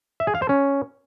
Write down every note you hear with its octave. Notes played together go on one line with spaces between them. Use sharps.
E5
G#4
F5
C5
C#4